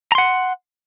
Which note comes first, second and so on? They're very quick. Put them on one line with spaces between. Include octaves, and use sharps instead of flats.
A#5 C6 F#5